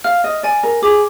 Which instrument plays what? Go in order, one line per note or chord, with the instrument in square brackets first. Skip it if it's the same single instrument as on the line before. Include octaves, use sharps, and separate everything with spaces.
[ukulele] F5 [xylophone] F6
[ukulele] D#5
[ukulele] D5 [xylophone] G#5
[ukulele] A#4
[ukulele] G#4 [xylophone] D6